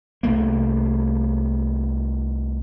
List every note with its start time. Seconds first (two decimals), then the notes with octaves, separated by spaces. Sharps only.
0.23 C2 A3 A#3